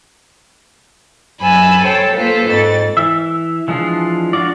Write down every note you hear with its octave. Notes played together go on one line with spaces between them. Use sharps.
F#2 G#5 B5 E6 A6
A4 C5 C#5 G5 A5
A#3 F4 A4 B4 C5
F2 G#2 A6
E3 E5
E3 F3 G#3 D4 F4
D4 F4 F#4 D5